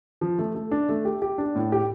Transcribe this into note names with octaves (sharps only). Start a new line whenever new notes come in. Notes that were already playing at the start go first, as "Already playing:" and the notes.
F3
A3
A3
D4
A3
G4
G4
D4
A2
G4